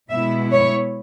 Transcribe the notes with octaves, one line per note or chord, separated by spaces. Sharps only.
B2 G#3 B3 E4 E5
C#5